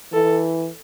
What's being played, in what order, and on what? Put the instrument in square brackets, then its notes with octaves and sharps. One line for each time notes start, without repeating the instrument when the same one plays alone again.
[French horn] E3 [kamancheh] A4